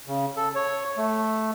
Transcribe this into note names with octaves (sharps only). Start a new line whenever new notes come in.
C#3
A4
C#5
A3